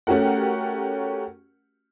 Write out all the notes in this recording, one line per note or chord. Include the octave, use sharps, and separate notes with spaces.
A3 C#4 F#4 G4 A#4 F#5